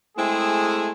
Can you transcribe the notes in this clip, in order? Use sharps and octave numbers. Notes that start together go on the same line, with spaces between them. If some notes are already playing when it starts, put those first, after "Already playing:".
G#3 A3 C4 E4 G#4